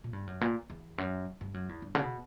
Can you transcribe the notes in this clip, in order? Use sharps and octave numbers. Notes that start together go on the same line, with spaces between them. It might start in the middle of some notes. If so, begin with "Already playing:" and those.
A#2
G2
F#2
A#2
E2
F#2
G2
F#2
E2
G2
C#3
B2